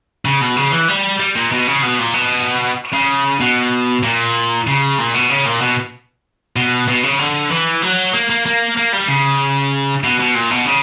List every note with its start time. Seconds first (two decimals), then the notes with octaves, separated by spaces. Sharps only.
0.25 C#3
0.41 B2
0.56 C#3
0.72 E3
0.88 G3
1.19 G3
1.35 A#2
1.52 B2
1.67 C#3
1.83 B2
1.99 A#2
2.14 B2
2.93 C#3
3.40 B2
4.03 A#2
4.67 C#3
4.98 A#2
5.14 B2
5.30 C#3
5.46 A#2
5.61 B2
6.56 B2
6.88 B2
7.03 C#3
7.19 D3
7.50 E3
7.82 F#3
8.13 A#3
8.30 A#3
8.46 A#3
8.77 A#3
8.93 G3
9.08 C#3
10.03 B2
10.20 B2
10.35 A#2
10.50 B2
10.66 C#3